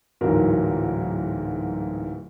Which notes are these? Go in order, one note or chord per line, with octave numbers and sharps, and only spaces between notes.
D1 G#2 E3 F#3 F4 A#4